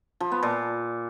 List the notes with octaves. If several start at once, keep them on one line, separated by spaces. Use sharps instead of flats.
F3
B3
A#2